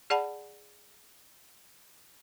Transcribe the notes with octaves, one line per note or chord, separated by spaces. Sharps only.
G#4 D5 F#5 A5 B5